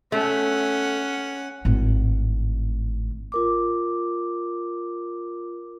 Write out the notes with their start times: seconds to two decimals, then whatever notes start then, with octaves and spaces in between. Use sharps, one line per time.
0.12 A3 C#4 F#5
1.65 G#1 A2
3.32 F4 A#4 D6